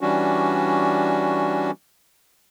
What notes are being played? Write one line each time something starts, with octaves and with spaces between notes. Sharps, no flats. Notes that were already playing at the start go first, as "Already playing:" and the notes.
E3 G3 C#4 D4 F#4